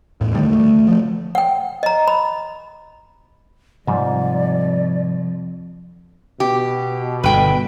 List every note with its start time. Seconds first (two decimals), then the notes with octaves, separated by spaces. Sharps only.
0.21 E2 A2
0.34 D3 D#3 G3 A3
0.51 D2 G3 A3
0.88 F3 A3
1.35 F#5 G5
1.83 D#5 A#5
2.08 B5
3.87 F2 G#2 C3 F3 G3 D5
6.40 B2 G4
7.23 G1 D3 B4 G5